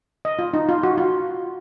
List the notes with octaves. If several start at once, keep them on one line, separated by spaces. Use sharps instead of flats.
D#5
F4
D#4
F4
F#4
F4